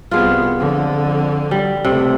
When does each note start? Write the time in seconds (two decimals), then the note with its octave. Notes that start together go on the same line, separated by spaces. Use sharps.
0.11 C2 B3 F4 G#4
0.59 F2 D3
1.51 G3
1.85 C#2 C3 A3